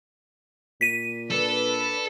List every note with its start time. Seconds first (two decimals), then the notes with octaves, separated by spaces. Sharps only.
0.81 A#2 B6 D#7
1.30 D4 A4 B4